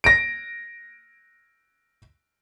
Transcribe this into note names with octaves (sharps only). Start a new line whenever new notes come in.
A#6 D7